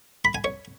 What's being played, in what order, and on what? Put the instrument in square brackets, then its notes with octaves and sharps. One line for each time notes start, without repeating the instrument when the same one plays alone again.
[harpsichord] B5
G#5
C#5